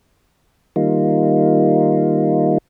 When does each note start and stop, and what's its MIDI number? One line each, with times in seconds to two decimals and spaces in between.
0.76 2.58 51
0.76 2.58 55
0.76 2.58 58
0.76 2.58 63
0.76 2.58 65